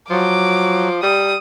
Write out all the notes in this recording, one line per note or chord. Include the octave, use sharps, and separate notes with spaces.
F3 F#3 D6
G3 D#6